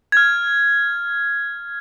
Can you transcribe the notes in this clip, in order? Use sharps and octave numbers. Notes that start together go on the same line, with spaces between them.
F6 G#6